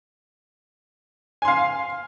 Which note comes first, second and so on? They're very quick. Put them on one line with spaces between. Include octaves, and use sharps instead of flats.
G#5 C6 F5